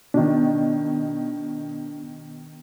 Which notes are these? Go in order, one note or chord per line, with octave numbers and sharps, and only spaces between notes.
B2 D#3 D4